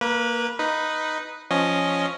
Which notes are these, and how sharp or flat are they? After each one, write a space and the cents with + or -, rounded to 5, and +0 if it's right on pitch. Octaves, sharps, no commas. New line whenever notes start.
A#3 +0 B4 -25
D#4 +0 B4 +0
F3 +0 C#4 +0 D#5 +0